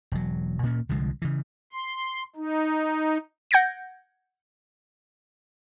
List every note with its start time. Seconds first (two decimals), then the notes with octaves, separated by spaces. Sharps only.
0.12 E1 F#3
0.63 A#2 A#3 C#4
0.89 C2 D3 F3 G#3
1.22 C#3 E3
1.73 C6
2.36 D#4
3.51 F#5 G6 G#6 A#6 D7